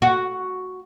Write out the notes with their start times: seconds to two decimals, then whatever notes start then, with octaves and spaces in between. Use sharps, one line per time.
0.02 F#4